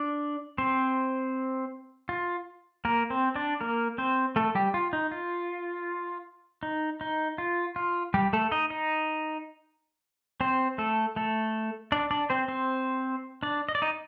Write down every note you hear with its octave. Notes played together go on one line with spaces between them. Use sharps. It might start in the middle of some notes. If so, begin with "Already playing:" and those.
Already playing: D4 D5
C4 C5
F4
A#3 A#4
C4 C5
D4 D5
A#3 A#4
C4 C5
A3 A4
G3 G4
F4
D#4
F4
D#4
D#4
F4
F4
G3 G4
A3 A4
D#4 D#5
D#4 D#5
C4 C5
A3 A4
A3 A4
D4 D5
D4 D5
C4 C5
C4 C5
D4 D5
D#5
D5
D#4 D#5